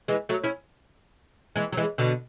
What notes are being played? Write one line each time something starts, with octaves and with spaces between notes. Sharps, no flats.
E3 G#3
F#3 A3
C#4 E4
E3 G#3
F#3
E3 G#3
B2 D3